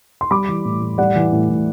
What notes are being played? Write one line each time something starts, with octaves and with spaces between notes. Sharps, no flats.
C6
G3 B5 D6
E3
A2
A2
G3 D5 F#5
E3
A2
A2